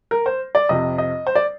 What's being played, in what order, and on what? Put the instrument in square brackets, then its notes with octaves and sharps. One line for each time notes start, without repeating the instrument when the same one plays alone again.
[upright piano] A#4
C5
D5
F2 C3 F3 D#5
D#5
C5
D5